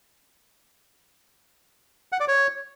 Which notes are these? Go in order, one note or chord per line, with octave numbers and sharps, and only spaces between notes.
F#5
D5
C#5